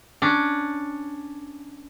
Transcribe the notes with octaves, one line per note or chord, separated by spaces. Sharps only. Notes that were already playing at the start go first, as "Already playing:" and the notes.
C#4 D4